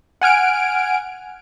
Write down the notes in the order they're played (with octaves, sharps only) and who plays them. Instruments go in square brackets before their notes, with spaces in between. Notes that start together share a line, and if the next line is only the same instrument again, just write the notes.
[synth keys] F#5 G#5 F6 D7